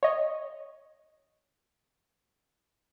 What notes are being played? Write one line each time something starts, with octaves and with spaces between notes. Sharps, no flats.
C#5 D#5